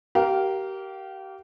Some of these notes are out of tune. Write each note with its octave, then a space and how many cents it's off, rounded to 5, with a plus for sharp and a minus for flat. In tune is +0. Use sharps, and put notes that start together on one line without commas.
G4 -30 A#4 +0 F5 -5